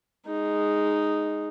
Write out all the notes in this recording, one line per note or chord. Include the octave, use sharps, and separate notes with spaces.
G#3 D#4